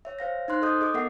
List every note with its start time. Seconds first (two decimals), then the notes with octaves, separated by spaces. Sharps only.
0.05 C#5 E5
0.19 C5 F5 A#6
0.48 D#4 C5 C6 F#6
0.62 A4 D#5 D#6 G6
0.81 G#4 D#5 D6
0.94 B3 A4 A#4 E5 F#5 C7